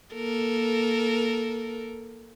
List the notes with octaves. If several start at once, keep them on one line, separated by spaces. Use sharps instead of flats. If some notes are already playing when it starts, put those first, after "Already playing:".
A#3 A4 A#4